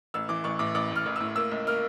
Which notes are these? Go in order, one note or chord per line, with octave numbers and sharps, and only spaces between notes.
A1 E6
E3 D6
A1 C#6
A2 D6
A1 D6
A2 F6
A1
A2 E6
A#3 E6
C#2
A#3 F6